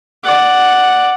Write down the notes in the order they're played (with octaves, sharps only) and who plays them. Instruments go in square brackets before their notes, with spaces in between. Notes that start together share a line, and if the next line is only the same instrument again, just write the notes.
[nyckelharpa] D5 F#5